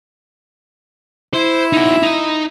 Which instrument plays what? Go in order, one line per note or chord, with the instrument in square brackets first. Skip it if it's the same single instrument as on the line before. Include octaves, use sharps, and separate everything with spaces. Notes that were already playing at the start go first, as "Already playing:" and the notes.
[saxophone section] E4 [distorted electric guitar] C5
[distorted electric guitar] D#4 F#4
D#4 D#5